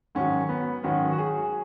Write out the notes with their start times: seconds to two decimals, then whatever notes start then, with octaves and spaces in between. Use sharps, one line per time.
0.15 G#2 D#3 F#3 C#4
0.49 B3
0.83 G#2 D#3 F#3 C#4
1.12 F#4
1.18 G#4